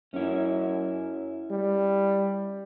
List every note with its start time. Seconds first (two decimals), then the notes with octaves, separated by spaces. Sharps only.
0.14 F#2 C#4 E4
1.51 G3